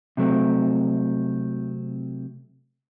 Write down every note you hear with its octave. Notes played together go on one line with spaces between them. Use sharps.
C3 F#3 A3 C4